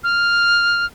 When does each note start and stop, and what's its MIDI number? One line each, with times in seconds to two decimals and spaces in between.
0.04 0.86 89